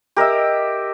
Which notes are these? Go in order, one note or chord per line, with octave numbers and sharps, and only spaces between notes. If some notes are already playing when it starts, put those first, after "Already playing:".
G4 A#4 D#5 E5